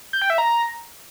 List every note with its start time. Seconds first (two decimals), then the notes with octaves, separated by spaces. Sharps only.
0.13 G6
0.22 G5
0.30 E5
0.38 A#5